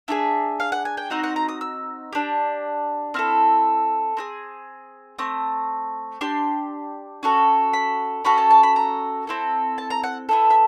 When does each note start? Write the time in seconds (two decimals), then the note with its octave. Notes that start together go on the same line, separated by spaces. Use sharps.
0.08 D4 F4 G#4 E5
0.60 F5
0.72 F#5
0.85 G#5
0.97 G5
1.10 C4 D#4 F#4 F#5
1.24 F#5
1.36 A#5
1.49 D#6
1.61 E6
2.13 D4 G4
3.14 C4 E4 A4 F6
4.17 C4 E4 G#4
5.18 A3 C4 D#6
6.21 D4 G4 C6
7.23 C#4 F#4 A4
7.73 B5
8.25 C#4 F#4 A4 B5
8.38 A5
8.51 A5
8.63 B5
8.76 A#5
9.27 C4 E4 A4
9.78 A5
9.90 A#5
10.03 F#5
10.29 B3 E4 A4
10.50 E5